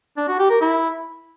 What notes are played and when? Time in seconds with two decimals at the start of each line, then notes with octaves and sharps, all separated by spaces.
0.17 D4
0.28 F#4
0.39 G4
0.50 A#4
0.61 E4